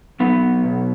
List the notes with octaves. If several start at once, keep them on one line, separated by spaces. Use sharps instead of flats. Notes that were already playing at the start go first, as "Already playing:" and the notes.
F#3 B3
B2